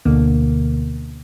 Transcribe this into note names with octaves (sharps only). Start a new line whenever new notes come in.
D2 B2 D3 A#3